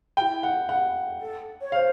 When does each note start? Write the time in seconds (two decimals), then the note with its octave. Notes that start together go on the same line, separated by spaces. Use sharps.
0.17 G#4 G5
0.21 E4
0.43 F#5
0.69 F#5
1.20 A4
1.61 C#5
1.72 C5 C#5 F5